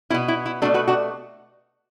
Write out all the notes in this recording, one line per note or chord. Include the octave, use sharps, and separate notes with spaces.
B2 B3 E4
E4
E4
B2 F#3 A3 D4 F#4
F#4 B4
D4 F#4